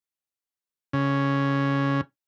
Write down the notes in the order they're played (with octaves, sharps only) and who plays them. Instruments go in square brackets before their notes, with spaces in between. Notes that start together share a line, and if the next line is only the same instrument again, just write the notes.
[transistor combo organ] C#3